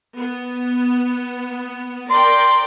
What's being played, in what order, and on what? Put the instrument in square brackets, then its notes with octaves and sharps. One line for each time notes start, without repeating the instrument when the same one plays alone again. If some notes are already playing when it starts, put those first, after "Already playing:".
[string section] B3
[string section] A#4 D5 G5 [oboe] C6